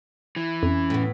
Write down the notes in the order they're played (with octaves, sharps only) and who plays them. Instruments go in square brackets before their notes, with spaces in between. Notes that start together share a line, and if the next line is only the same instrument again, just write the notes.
[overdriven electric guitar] E3
[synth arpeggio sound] F2 [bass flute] C#4
[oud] A2 B3